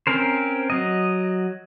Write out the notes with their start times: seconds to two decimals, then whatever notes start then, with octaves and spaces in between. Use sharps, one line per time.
0.07 C4 C#4 A#4 C5
0.70 F#3 D#5